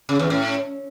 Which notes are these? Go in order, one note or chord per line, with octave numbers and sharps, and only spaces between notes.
C#3
E2
A2